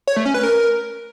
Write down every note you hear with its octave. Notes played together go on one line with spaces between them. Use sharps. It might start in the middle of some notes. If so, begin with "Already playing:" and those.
C#5
A3
C#4
B4
A#4